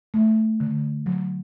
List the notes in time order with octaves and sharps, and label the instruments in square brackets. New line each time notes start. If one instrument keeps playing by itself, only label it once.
[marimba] A3
D3
F#3